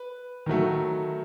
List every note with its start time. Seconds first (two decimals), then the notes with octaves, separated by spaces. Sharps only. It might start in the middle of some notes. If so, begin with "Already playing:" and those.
Already playing: B4
0.46 D#3 F#3 A3